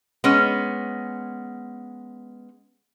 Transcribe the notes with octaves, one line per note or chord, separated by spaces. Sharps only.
G#3 B3 C#4